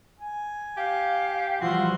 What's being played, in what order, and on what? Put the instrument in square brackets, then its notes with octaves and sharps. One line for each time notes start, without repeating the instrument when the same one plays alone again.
[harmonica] G#5
[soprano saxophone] G4 [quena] F5
[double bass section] E3 F3 G3 [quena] F4 [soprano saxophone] F#4 [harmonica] E5 F#5 C6